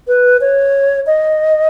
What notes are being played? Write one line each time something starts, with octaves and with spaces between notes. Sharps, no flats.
B4
C#5
D#5